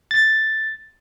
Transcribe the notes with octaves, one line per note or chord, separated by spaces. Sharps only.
A6